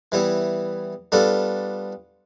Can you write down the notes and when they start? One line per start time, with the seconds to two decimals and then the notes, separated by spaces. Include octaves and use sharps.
0.12 E3 G3 B3 E4
1.12 G3 B3 D4 F4 A4